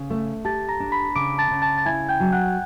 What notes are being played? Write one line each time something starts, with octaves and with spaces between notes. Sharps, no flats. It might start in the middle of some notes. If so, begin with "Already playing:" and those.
Already playing: C#3
A3
G4 A5 A6
A#5 A#6
D4
B5 B6
C#3 D6 D7
A5 A6
C#3
A5 A6
A6
E4 G#5 G#6
G5 G6
F#3
F#5 F#6